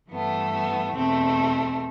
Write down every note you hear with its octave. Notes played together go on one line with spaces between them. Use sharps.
G2 E3 A3 B3
B3
E2 B2 A3 C4